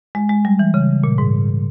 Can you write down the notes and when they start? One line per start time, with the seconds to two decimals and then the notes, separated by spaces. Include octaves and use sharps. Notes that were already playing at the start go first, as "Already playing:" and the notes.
0.15 G#3
0.30 G#3
0.45 G3
0.59 E3
0.74 C#3
1.04 A#2
1.18 G#2